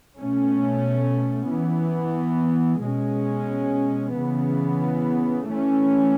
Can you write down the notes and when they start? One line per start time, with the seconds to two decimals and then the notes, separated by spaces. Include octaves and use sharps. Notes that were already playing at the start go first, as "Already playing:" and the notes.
0.17 B2 A3 C#4
1.50 E3 B3
2.83 B2 G#3 C#4
4.17 C#3 E3 B3
5.50 E3 A3 C#4